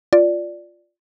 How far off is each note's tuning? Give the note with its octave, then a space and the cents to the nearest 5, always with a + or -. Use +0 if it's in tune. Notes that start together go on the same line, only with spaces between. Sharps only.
F4 +0 D5 +0